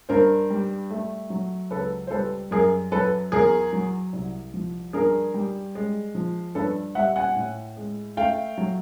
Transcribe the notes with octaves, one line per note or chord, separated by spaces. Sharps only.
G2 A#4 C5
G3
A3
F#3
C#2 A4 B4
C5
G3 A4 B4
F#2 G#4 A#4
F#3 A4 B4
E2 G#4 A#4
F#3
C2
F3
G2 G#4 A#4
G3
G#3
F3
G2 A4 B4
G3 E5 F#5
F#5 G#5
A2
G#3
A3 F5 G5
F#3